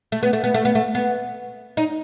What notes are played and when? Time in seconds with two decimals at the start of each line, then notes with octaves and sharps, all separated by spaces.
0.12 A3
0.23 B3
0.33 A3
0.44 B3
0.54 A3
0.65 B3
0.75 A3
0.95 B3
1.77 D#4